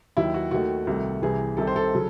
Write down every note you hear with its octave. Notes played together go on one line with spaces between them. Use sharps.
D#2 D#3 F#3 E4
F#4
D#2 D#3 A3 F#4
C2 C3 D#3 A3
C2 C3 E3 G#4
C2 C3 D#3 A4
C5
A4
C#3 F#3